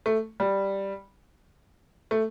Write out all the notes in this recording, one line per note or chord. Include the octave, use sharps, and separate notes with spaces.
A3
G3
A3